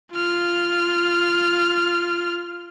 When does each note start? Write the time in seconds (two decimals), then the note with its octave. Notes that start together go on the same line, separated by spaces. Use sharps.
0.13 F4 F6